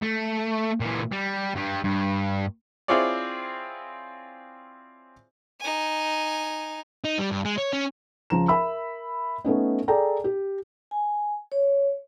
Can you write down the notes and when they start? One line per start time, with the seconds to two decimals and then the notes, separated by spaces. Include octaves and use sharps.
0.02 A3
0.81 A#2 E3
1.12 G3
1.55 G2 G3
1.84 G2
2.88 C4 E4 F4 G#4 C#5 D5
5.60 D#4 G#5
7.04 D#4
7.19 G3
7.31 G2
7.45 G#3
7.58 C#5
7.73 C#4
8.30 C#2 F3 A#5 E7
8.48 A#4 E5 B5 E6
9.45 A3 B3 C#4 D#4
9.88 G#4 A4 D5 G5 A#5
10.24 G4
10.91 G#5
11.52 C#5